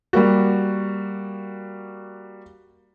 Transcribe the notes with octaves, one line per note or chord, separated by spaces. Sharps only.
G3 A#3 F#4